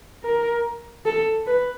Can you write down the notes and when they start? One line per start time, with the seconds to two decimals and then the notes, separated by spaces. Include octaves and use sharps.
0.24 A#4
1.05 A4
1.47 B4